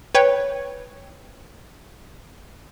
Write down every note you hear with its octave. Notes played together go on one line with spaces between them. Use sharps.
B4 C#5 G5